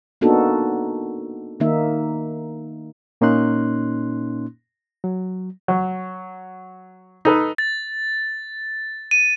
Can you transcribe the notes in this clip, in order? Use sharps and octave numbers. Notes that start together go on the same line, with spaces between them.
A#3 B3 D4 D#4 F#4 A4
D#3 A#3 D#4 E5
A#2 A#3 C#4 D#4 C6 F#6
F#3
F#3
D#4 A4 B4
A6
D#7